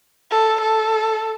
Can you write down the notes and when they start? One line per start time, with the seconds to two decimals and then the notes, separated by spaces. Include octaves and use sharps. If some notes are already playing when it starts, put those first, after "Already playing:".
0.31 A4
0.61 A4